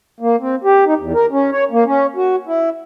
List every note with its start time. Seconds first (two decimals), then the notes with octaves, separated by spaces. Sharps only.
0.20 A#3
0.40 C4
0.64 G4
0.86 D#4
0.99 E2
1.14 A#4
1.31 C#4
1.52 C#5
1.71 A#3
1.86 C#4
2.16 F#4
2.47 E4